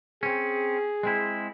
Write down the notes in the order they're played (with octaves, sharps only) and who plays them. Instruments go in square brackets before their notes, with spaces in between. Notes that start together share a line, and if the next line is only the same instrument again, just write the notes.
[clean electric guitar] C4 C#4 [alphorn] G#4
[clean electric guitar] G#3 C4 E4